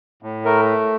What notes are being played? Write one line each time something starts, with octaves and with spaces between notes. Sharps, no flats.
A2
A3 A#4